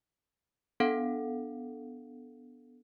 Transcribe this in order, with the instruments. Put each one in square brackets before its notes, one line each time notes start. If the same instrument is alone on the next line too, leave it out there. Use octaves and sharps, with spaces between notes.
[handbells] B3 D4 A4 F5 F#5